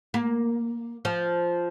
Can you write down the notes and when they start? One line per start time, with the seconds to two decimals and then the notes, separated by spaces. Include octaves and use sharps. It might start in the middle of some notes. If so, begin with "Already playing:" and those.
0.14 A#3
1.05 F3